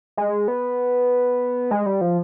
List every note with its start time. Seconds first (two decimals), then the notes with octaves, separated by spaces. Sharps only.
0.17 G#3
0.48 B3
1.71 G#3
1.86 G3
2.01 F3